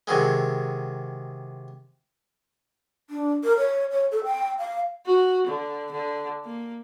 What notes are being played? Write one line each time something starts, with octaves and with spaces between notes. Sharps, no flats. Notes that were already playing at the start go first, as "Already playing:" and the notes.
C3 D#3 F#3 G#3
D4
A#4
C#5
C#5
A4
G5
F5
F#4
D3
D3
A#3